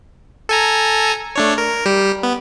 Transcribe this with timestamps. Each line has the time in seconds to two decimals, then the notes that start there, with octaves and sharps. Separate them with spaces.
0.49 A4 G#5 A#5
1.36 A3 D4 C#5
1.58 A#4
1.86 G3 G4
2.23 B3